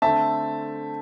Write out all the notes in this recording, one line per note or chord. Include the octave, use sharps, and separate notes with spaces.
D3 A3 C4 E5 A5